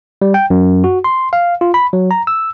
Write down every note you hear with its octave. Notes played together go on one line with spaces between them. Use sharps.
G3
G5
F#2
F#4
C6
F5
F4
B5
F#3
A#5
E6